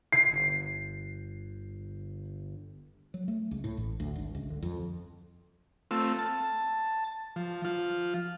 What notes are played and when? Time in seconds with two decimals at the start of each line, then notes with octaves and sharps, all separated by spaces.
0.13 C7
0.30 G1
3.14 F#3
3.28 A3
3.51 C#2
3.64 A2
3.77 A1
4.00 D2
4.16 G#1
4.35 C#2
4.50 D3
4.62 F2
5.91 A3 C4 F4 E6
6.19 A5
7.36 F3
7.65 F3 F4